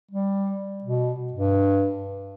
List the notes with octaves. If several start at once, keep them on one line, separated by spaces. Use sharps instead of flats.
G3
B2
G2